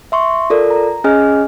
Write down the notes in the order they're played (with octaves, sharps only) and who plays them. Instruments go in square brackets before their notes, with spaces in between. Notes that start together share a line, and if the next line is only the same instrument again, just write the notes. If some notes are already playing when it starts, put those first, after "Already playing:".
[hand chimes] E5 C6 C#6
F4 A4 A#4 D5
A#5
C#4 G#4 D#5 G#5 F6